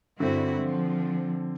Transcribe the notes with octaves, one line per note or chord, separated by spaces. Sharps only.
G2 D3 C4 E4 F#4
F3